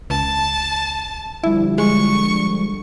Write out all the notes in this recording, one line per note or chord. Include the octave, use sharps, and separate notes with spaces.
C#2 A5
D3 F3 G3 E4
G#3 C#6